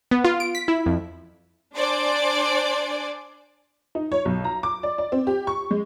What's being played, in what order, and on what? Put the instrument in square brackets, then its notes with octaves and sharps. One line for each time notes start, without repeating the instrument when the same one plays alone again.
[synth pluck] B3
F4
D7
B6
E4
F2
[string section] D4 C5 D5 G#5
[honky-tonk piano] D#4
C#5
B1
A#5
D6
D5
D5
C4
G4
C#6
G#3